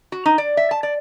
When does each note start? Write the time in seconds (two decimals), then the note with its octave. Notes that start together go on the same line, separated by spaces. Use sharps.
0.12 F#4
0.25 D#4
0.38 D5
0.57 E5
0.71 A5
0.83 D5